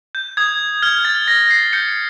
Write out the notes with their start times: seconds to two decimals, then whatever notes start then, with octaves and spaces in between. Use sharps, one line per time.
0.15 G6
0.37 D#6 G#6
0.83 F6 G#6
1.05 A6
1.27 F6 A#6
1.51 C7
1.73 G6 C#7